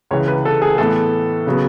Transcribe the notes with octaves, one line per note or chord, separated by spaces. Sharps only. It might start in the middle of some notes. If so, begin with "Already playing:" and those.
C#2 C#3 E3 C#5
B4
A4
G#4
A2 E3 B3 A4
C#3 F#3 B3